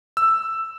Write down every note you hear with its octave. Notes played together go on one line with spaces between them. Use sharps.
E6